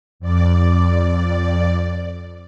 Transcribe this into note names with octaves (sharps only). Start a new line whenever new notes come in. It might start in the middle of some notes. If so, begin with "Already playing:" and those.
F2 D5